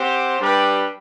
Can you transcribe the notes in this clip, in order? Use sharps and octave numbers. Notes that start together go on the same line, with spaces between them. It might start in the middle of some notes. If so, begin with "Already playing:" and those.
Already playing: C4 G4 C5 F#5
G3 D4 G4 B4